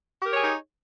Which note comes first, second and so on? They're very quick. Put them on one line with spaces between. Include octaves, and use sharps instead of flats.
G4 A#4 C#5 G#4 D#4